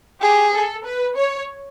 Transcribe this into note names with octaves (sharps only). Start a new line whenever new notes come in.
G4 G#4
A4
B4
C#5